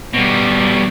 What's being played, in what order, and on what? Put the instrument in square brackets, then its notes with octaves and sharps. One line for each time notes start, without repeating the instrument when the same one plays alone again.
[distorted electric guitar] B2 G3